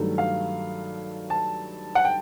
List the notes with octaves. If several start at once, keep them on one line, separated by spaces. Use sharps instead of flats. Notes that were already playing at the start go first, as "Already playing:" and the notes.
Already playing: G2 D#3 F#3 A3
F5
A5
F#5
G5